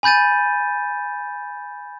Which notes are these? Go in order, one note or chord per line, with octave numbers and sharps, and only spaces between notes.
G#5 B5 G6 A6 D#7